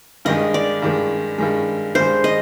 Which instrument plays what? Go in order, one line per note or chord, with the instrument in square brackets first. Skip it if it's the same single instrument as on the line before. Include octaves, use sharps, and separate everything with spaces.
[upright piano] G2 D#3 G#3 [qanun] D#5
[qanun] D5
[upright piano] G2 D#3 G#3
G2 D#3 G#3
[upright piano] G2 D#3 G#3 [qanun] C5
[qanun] D#5